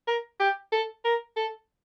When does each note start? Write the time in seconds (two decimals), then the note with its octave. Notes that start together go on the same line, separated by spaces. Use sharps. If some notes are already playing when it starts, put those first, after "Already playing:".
0.07 A#4
0.40 G4
0.72 A4
1.04 A#4
1.36 A4